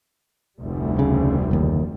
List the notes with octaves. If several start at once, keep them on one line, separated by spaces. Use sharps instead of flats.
F1 D2 G3
C#3
F#1 D#2